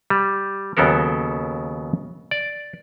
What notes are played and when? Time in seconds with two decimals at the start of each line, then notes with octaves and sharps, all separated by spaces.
0.10 G3
0.77 D#2 C#3 F#3 B3 A4 A#4
2.31 D5